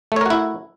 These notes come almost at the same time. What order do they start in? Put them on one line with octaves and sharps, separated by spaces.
A3 C#5 A#4 F#4 E4